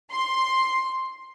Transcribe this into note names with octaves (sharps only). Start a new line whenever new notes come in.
C6